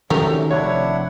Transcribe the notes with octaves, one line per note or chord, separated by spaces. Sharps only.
F#2 C3 D#3 F#3 A3 C#4 G4 A#4
F1 D4 E4 C#5 F#5